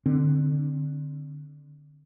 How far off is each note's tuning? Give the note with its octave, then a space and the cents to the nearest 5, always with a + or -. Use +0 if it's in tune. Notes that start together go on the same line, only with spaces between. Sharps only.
D3 +10 C4 +0